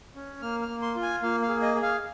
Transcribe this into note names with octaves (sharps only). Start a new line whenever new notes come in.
C#4
A#3 F6
F6
A#3
C6
F4
G#5
A#3 F5
F5
G#4
D#5
G#4
F5